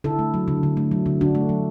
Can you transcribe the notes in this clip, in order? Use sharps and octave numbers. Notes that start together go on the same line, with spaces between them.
D3 E4 A4
A3
F#3
D3
D3
A3
F#3
D3
D3 D4 F#4
A3
F#3